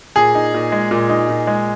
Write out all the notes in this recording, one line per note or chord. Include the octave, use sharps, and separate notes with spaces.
A#2 G#4
D#4
A#2
G#3
A#2
D#4
A#2
G#3